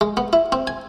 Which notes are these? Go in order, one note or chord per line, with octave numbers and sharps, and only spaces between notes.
G#3
B3
E4
C4
G#5